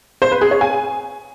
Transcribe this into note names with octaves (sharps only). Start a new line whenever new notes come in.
C5
B4
G#4
C#5
G#5